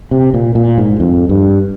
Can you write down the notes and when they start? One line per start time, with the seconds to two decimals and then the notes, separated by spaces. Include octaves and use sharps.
0.11 C3
0.34 A#2
0.55 A#2
0.78 G#2
1.00 F2
1.29 G2